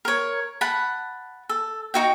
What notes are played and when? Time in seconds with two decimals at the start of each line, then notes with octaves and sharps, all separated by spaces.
0.05 A#4 C#5
0.61 F#5 A5 B5
1.49 A4
1.94 D#4 F#4 G5